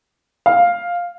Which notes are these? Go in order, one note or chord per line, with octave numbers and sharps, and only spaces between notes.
F5